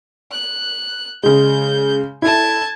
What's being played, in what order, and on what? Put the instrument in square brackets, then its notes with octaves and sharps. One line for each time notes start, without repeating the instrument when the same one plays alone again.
[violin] F#6
[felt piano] C#3 G#3 [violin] G6
[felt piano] E4 A4 [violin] A5 G#6